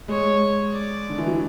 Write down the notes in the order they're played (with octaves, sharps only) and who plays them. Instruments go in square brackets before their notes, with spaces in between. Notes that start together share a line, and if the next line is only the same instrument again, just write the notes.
[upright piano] G#3 [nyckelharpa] C#5
[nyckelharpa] D5
[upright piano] D3
E3
F#3